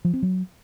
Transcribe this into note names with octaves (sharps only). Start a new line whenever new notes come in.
F3
C4
F#3